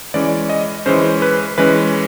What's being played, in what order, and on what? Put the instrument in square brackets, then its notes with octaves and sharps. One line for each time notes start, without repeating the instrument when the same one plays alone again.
[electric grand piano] E3 G#3 C#4 D5
D#5
E3 G#3 C#4 C5
B4
E3 G#3 C#4 B4